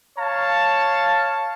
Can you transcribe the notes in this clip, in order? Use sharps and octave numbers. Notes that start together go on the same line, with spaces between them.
C#5 F5 A5